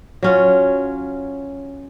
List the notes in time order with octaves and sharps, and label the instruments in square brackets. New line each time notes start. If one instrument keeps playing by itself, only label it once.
[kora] F#3 C#4 F4